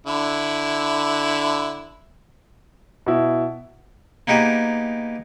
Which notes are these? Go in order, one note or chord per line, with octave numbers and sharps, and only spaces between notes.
D3 E4
B2 E4
A#3 B3 D#4 G4 G#4